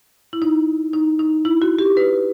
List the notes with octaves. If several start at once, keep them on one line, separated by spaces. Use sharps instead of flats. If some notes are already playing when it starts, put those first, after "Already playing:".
E4
D#4
D#4
D#4
E4
F#4
G4
B4